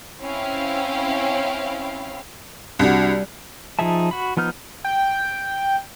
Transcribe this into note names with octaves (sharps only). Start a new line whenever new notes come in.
C4 C#4 E4 F5 G5
C2 G3 D4 F#4
F3 D#4 G#4 E5 A5
F#4 B5
F3 B3 D#4 F6 G6
G5